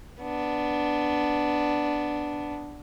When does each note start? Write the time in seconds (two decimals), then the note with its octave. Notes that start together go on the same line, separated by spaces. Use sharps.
0.21 B3 D4